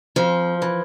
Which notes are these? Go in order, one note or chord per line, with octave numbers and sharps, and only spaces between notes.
F2 F3
E3